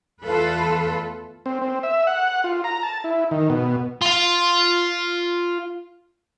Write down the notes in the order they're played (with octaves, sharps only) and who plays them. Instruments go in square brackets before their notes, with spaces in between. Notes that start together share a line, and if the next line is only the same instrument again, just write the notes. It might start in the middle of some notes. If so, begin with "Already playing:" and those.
[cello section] E2 A3 F4 A4 B4
[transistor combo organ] C4
C4
E5
F#5
F4
A#5
A5
E4
D#3
B2
[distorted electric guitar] F4 F5